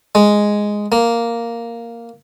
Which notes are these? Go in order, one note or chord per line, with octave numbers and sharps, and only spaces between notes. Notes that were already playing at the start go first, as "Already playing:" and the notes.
G#3
A#3